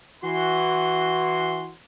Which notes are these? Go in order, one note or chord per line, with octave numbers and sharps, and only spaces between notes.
E3 F#4 C6